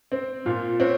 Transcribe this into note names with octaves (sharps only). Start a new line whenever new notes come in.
C4
A#2 F4
C4 C#5